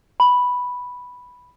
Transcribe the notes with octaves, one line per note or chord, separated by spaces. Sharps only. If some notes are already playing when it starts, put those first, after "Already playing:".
B5